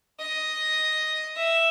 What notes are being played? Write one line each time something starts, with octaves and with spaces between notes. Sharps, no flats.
D#5
E5